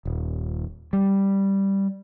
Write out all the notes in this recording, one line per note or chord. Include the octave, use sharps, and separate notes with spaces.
D#1
G3